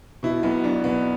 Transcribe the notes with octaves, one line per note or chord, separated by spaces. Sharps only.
B2 E4
B1 B3
B1 D4
B2 B3